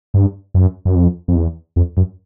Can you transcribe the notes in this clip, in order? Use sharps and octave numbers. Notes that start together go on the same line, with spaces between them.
G2
F#2
F#2
F2
F2
E2
F2
F#2